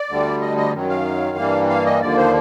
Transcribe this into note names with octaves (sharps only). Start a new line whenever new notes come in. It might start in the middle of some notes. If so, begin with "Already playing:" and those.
Already playing: D5
D2 D3 G3
D#5
D#5
F#2 D#3 F#3
F5
G2 E3 G3 A#3
F5
D#5
D#2 D3 F3 A#3 D5
C5